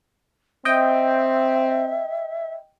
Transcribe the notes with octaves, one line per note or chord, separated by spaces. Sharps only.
C4 D#5 E5 G5